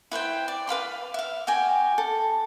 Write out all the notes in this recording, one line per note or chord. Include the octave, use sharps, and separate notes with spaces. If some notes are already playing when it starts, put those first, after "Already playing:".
E4 B4 C5 G5
D5
B4 F5 B5 C6
E5 F5
F#4 G4 G5 G#5
A4